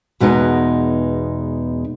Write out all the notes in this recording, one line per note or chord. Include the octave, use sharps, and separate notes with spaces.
E2 B2 G#3 B3 D#4